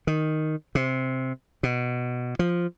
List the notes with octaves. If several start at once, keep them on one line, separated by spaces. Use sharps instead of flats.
D#3
C3
B2
F3